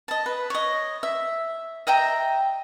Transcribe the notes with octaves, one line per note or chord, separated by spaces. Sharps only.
D#5 A5
B4
C#5 D#5
E5
D#5 E5 G5 A#5